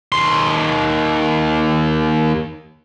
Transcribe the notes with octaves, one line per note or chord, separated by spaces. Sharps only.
D#2 C6